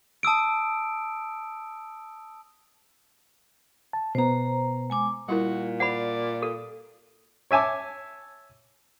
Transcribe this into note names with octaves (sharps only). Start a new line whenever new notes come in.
A5 D#6 E6 D7
A5
B2 B3 C5 A#5
G#3 G#5 D6
A#2 G3 E4 F#4 A#4
C5 D5 F#5 B5
A4
C#5 E5 G#5 A5 D6